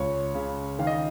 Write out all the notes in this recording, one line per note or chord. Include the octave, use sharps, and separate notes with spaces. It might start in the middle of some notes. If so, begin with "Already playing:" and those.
Already playing: C#2 C#5
C#3
D#3 F5
D#5